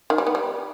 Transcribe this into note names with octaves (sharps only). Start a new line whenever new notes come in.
D#3
G3
B3
G3